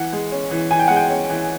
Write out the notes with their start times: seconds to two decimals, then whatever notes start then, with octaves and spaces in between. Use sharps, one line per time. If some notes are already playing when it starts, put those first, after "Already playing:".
Already playing: E3 F#5
0.13 G#3
0.32 C#4
0.51 E3
0.71 E3 G#5
0.79 G5
0.88 G#3 F#5
0.96 G5
1.10 C#4
1.30 E3